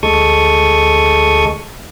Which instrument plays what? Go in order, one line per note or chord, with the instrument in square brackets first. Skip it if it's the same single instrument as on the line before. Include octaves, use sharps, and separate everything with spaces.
[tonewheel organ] D2 G#3 A4 C#6 D#6